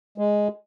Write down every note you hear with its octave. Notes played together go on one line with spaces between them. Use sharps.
G#3